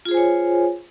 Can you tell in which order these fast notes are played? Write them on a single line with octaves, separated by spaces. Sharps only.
F4 G#4 C5 G#5 C#5